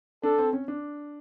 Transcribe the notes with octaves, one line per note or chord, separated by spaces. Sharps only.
D4 A4
C4
C#4
D4